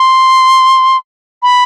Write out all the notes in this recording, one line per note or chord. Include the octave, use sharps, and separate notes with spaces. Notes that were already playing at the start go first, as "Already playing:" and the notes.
Already playing: C6
B5